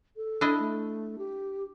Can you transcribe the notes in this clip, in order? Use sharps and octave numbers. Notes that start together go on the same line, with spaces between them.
A4
D4 E4 D#5
A3
G4